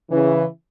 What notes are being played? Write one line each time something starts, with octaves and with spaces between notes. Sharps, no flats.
C#3 E3